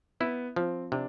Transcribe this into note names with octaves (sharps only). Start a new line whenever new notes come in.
B3 E4
F3 C4
C3 D4